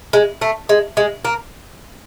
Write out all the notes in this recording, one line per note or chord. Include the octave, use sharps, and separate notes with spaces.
G#3
A3
G#3
G#3
A#3